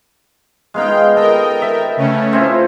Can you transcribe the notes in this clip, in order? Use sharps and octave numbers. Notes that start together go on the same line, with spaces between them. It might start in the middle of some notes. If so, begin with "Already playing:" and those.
G#3 B3 D#4 F5 G5
A4 A#4 D#5 G5
E5
C#3 A3 C#4
C4 E4 F4